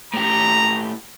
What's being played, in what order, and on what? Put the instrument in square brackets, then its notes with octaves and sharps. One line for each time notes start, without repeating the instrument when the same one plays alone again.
[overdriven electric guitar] A2 G4 [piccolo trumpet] A#5